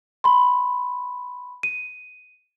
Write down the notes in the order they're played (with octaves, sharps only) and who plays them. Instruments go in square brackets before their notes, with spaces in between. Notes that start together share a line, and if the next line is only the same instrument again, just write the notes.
[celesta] B5 C6
D#7